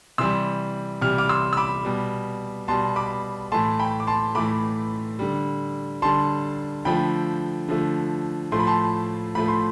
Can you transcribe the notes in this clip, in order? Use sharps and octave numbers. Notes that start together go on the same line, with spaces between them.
C3 E3 G3 C6 E6
C3 E3 G3 F6
D6 F6
C6 E6
E6
B5 D6
B2 G3
B2 G3 A5 C6
B5 D6
A2 E3 A3 A5 C6
G5 B5
D6
A5 C6
A2 E3 A3 B5 D6
D3 G3
D3 G3 A5 C6
D3 F3 A3 G5 B5
D3 F3 A3
A2 F3 A3 C6
B5
A5 C6
A2 F3 A3 B5
C6